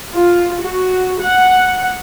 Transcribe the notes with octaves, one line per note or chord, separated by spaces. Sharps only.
F4
F#4
F#5